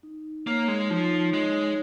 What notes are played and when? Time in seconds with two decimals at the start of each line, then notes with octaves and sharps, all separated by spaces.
0.03 D#4
0.47 A#3 C#5
0.68 G#3
0.90 F3 D#4
1.33 G#3 C#5